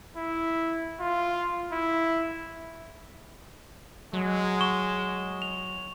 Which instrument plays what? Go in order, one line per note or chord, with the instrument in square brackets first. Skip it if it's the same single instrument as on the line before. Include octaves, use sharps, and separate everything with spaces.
[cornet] E4
F4
E4
[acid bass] F#3 [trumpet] G#3
[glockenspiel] C#6 E7 G7
F7